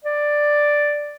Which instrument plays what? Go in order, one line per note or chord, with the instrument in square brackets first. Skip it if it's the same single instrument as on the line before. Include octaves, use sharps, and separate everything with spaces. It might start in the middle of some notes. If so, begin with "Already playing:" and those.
[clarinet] D5